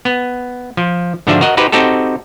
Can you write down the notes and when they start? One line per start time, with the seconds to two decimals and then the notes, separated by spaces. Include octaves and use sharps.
0.05 B3
0.77 F3
1.27 G#2 D3 F3 D4 F#4 E5
1.41 F#4 A#4 D#5 F#5
1.57 D#4 F#4 G4 B4 C5
1.72 C4 D#4 F#4 G4 A4